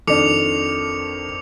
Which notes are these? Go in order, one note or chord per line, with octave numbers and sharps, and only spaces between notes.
F2 D#3 D4 A4 D6 C#7 F7